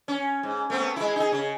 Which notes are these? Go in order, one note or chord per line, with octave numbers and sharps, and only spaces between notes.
C#4
G#2
A3 B3 C4
G#3 E4
D#4 G#4
C#3